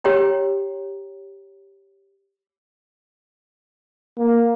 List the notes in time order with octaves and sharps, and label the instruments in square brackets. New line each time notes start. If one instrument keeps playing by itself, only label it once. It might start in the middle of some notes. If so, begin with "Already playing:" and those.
[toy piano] G4 C#5 G5 A#5
[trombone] A#3